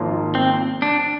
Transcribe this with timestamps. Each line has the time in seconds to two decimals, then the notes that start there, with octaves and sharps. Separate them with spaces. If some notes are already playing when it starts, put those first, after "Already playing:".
Already playing: G#1 G#2 F3 A#3 F4
0.35 C4
0.82 D4